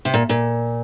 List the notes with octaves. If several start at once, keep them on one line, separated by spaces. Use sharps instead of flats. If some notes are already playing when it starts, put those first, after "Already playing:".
C3
A#2
A#2